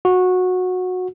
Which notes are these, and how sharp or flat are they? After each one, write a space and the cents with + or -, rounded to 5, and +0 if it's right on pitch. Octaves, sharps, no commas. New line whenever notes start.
F#4 -15